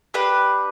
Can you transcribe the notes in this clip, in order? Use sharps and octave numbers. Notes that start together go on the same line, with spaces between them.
D4 G4 B4